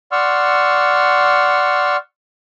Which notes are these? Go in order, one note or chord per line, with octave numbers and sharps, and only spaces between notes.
D5 F#5 C6 C#6 E6 F6